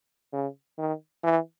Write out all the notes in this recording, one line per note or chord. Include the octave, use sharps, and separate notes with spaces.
C#3
D#3
E3